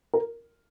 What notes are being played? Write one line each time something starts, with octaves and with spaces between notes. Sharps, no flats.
A#4